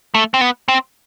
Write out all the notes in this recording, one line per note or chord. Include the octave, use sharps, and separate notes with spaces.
A3
C4
B3
C4